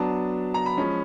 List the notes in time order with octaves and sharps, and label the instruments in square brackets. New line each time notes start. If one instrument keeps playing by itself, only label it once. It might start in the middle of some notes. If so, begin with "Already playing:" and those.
Already playing: [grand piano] F#3 B3 D4 A5
A#5
B5
F3 G#3 C#4